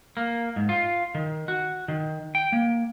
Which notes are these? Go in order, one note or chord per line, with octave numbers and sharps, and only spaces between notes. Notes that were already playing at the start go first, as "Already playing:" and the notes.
A#3
G#2
F4
D#3
F#4
D#3
G5
A#3